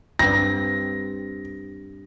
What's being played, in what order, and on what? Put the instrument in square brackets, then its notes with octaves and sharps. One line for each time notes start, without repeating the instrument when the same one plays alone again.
[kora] G2 C4 [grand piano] A#6